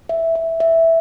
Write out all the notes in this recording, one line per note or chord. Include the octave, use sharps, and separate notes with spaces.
E5
E5
E5